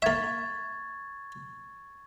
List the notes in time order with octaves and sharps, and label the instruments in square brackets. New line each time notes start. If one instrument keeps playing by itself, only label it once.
[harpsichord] A#3 E5 [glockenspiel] C#6 G#6 A6